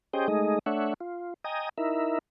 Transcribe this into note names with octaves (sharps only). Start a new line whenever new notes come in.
C#4 G4 G#4 C5 D#5 G5
G#3 A3 D#4 G#4 D#5
A3 D4 C#5 E5 F#5
F4
D#5 G5 G#5 A#5 D#6
D#4 E4 A#4 E5